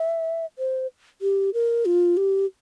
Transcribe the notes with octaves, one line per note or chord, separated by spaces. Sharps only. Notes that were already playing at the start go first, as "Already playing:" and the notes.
Already playing: E5
C5
G4
A#4
F4
G4